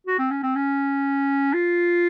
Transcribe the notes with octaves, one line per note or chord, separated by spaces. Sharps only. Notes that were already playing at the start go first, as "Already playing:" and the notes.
F#4
C4
C#4
C4
C#4
F4